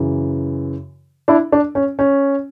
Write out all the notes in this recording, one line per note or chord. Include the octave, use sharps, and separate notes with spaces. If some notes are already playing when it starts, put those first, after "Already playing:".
Already playing: F#2 C#3 E3
D4 E4
D4
C#4
C#4